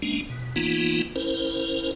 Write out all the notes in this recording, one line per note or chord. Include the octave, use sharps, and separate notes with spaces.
G#3 A#3 C#4 D4
B2
E3 A#3 B3 D#4 F4
C#4 E4 A#4 C5